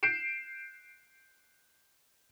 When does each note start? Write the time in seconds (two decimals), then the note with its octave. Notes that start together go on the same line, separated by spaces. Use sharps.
0.03 G6 C7 D7 E7